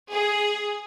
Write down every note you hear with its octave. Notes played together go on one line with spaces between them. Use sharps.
G#4